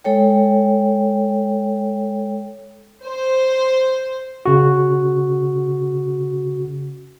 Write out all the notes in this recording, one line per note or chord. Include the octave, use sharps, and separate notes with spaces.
G#3 A4 C#5 G5
C5
C#3 F#4